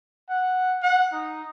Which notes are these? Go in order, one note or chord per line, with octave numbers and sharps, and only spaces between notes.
F#5
F#5
D#4